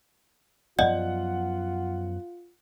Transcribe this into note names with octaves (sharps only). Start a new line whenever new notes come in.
F#2 F3 B3 F4 D5 D#5 F#5